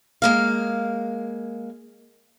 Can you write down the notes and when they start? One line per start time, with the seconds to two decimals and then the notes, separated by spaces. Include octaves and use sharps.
0.22 G#3 A#3 F5